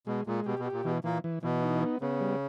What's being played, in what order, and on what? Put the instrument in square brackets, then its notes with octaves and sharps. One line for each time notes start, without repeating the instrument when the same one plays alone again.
[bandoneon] B2 [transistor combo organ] G#3
[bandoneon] A#2 [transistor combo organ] G#3
[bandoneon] B2 [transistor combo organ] G4
[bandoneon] B2
[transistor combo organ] G4
[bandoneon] A#2
[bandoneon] B2 [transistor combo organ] E3
[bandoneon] A#2 A#3 [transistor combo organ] E3
[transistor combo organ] E3
[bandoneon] B2 [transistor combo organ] E3
[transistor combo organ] D#4
B3
[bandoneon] C#3 [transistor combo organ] B3
[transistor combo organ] G3